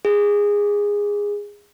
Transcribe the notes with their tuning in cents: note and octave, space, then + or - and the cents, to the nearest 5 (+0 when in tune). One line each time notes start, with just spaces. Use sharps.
G#4 -15